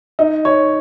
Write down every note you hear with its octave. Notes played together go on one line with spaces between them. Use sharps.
D#4
C#5